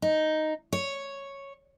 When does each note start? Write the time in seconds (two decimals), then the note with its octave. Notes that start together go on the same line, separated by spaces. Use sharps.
0.02 D#4
0.73 C#5